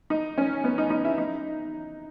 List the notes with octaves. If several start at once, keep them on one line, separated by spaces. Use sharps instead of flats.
D#4
C#4
B3
D#4
D#4
E4
D#4